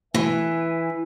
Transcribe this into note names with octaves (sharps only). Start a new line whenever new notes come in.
B2 E3 A3 B4 E5 G#5